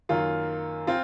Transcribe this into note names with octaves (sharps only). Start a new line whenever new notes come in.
F#2 D#3 A#3 F4
C4 F4